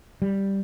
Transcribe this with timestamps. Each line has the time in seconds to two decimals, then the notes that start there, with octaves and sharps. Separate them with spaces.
0.22 G3